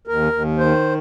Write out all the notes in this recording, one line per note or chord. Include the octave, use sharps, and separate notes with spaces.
D#2 A#4
D#2
D#3 C5